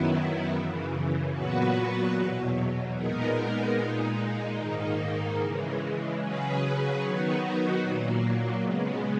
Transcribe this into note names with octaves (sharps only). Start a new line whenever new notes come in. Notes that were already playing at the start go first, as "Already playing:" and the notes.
Already playing: F#2 D#3 F#3 B3 E4
F#2 C#3 E3
A#2 F#3 B3 F#4 B4
E2 B2 F#3
A#2 G#3 B3 D#4 A#4
A#2 G#3 D#4
G#2 D#3 A#3 D#4
C#3 E3 G#3
C#3 F#3 C#4 G#4 B4
D#3 F#3 B3 D#4 F#4
A#2 F#3 A#3
C#3 G#3 B3